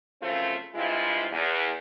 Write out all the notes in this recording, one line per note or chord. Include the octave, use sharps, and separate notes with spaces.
F#2 C#3 F3 A3 C4 F4
G2 C3 G#3 E4 F4
E2